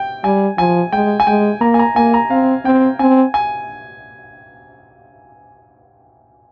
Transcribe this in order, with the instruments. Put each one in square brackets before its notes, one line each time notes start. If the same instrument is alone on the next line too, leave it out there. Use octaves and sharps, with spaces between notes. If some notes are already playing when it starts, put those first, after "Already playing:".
Already playing: [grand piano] G5
[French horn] G3 [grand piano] G#5
[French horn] F3 [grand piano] G#5
[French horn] G#3 [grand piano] G5
[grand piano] G#5
[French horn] G#3 [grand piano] G5
[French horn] A#3 [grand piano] A#5
[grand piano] G#5
A#5
[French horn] A#3 [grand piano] G#5
[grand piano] A#5
[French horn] C4 [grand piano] F5
[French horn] C4 [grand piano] G5
[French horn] C4 [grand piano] G#5
[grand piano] G#5